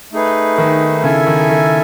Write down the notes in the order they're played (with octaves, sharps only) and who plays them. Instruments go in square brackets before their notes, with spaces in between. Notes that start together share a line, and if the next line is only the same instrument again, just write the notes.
[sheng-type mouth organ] A3 D#4 G#4 B4
[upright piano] D#3
[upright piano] C#3 [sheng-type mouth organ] E4 A4 E5 G#5
[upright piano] D#3
D#3